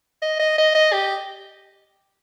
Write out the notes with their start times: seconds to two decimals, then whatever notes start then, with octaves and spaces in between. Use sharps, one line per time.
0.22 D#5
0.39 D#5
0.58 D#5
0.75 D#5
0.93 G4